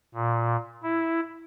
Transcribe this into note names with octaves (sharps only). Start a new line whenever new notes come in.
A#2
E4